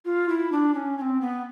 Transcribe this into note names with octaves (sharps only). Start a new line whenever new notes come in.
F4
E4
D4
C#4
C#4
C4
B3